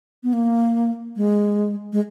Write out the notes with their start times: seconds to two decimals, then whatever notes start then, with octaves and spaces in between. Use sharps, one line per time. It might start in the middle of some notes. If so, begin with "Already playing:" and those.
0.23 B3
0.33 A#3
1.16 G#3
1.93 G#3